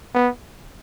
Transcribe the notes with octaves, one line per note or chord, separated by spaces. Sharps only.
B3